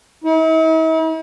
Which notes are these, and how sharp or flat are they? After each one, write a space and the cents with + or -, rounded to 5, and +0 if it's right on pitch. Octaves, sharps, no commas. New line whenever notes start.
E4 -45